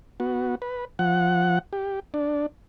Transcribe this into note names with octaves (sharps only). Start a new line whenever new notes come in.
B3 F#4
B4
F3 F#5
G4
D4